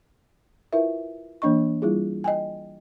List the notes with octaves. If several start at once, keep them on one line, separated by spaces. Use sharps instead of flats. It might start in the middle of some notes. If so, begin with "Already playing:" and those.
E4 F4 A#4 B4 E5
E3 A#3 D4 D#5 C#6
G3 E4 F4 G#4
D#5 G5 G#5